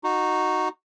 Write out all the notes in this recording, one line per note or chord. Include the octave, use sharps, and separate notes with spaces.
D#4 F#4